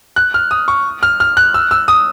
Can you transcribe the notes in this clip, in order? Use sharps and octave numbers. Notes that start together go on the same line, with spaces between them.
F#6
F6
D#6
C#6
F6
F6
F#6
E6
E6
D#6